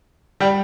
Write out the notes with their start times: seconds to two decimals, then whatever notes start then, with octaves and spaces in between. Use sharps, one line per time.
0.40 G3 G4